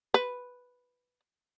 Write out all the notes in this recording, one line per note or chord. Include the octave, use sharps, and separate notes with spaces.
B4